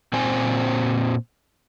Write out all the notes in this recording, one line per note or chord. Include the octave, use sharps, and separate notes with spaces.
A#2 C4 C5 G#5